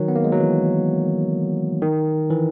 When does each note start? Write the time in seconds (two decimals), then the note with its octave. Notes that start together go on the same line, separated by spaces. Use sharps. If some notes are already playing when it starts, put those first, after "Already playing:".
Already playing: D#3 F#3
0.08 B3
0.16 A#3
0.24 G#3
0.32 F#3
0.40 E3
1.82 D#3
2.30 E3